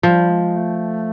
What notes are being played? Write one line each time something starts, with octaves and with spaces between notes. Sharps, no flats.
F3 G3
G#3
A3